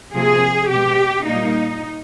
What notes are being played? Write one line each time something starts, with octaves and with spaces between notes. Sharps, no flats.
C3 F3 A#3 G#4
B2 G#3 G4
A#2 G3 A#3 D#4